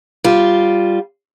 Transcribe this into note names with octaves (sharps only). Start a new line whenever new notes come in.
G3 F4